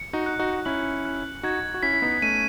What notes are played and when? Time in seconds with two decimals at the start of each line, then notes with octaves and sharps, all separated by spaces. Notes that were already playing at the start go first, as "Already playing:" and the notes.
Already playing: C#7
0.13 D#4 F#4
0.26 F#6
0.39 D#4 F#4
0.65 C#4 E4 F#7
1.05 F#6
1.43 D#4 F#4 G#6
1.74 F#4
1.82 C#4 E4 B6
1.93 E4
2.02 B3 D#4
2.22 A3 C#4 D#7